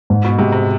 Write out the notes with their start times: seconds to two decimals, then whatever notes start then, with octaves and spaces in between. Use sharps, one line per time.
0.10 G#2
0.24 B2
0.39 C3 G#3
0.52 C3